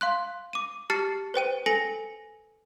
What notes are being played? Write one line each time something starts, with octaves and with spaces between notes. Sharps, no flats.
F5 C6 F#6
D6 D#7
G4 A5 F6 A6 C7 C#7
B4 C5 G5 D#7
A4 G#5 A#6 C#7 F#7